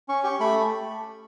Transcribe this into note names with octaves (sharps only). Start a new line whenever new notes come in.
C#4 C#6
G4 C#6
A3 B5